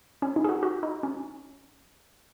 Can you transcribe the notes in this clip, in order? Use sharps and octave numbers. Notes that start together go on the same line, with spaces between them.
C#4
D#4
G#4
F#4
F#4
D#4
C#4